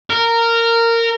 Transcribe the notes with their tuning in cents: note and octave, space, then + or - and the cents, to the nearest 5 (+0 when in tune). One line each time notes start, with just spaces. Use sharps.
A#4 -15